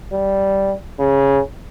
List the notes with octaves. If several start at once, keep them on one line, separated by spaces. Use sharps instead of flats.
G3
C#3